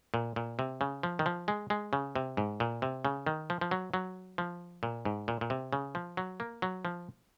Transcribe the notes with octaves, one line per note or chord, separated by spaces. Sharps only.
A#2
A#2
C3
C#3
F3
D#3
F3
G#3
G#3
C#3
C3
G#2
A#2
C3
C#3
D#3
F3
F3
F#3
F#3
F3
A#2
G#2
A#2
A#2
C3
C#3
F3
F#3
A#3
F#3
F3